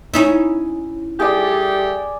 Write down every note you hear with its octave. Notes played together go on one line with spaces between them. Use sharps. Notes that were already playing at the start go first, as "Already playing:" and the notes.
C#4 D#4 E4
G3 A3 G4 G#4 D5